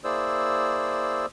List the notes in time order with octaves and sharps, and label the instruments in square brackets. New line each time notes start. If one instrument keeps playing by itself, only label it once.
[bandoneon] A#3 E4 G#4 C5 D5 E6